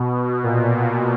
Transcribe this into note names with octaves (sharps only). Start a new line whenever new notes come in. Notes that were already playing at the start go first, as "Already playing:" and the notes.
Already playing: B2
A#2